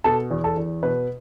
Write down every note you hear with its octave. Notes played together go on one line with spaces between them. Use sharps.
B2 A4
E2
A4
E2
B2 B4